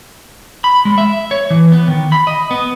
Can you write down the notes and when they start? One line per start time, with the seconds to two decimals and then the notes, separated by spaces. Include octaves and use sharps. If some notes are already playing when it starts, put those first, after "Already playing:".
0.64 B5
0.85 G#3
0.98 E5
1.31 C#5
1.50 E3
1.72 B3
1.88 D#3
2.12 B5
2.27 D#5
2.51 B3